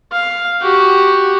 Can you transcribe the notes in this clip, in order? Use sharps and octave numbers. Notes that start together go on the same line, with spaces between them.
F5
F#4 G4